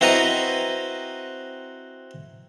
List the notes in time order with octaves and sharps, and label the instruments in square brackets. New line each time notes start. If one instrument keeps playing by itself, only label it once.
[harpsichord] C4 E4 F#4 B4 D#5 A#5